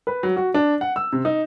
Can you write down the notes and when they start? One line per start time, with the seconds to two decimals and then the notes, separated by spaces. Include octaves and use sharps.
0.07 B4
0.23 F#3
0.36 F#4
0.54 D4
0.81 F#5
0.96 E6
1.12 C3
1.25 D#4